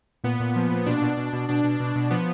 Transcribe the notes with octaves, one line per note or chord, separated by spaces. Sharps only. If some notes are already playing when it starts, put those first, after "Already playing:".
A#2 B3
A#2
F3
A#2
B2 D4
B2
B2
B2
B2 D4
B2
B2
B2
F3 B3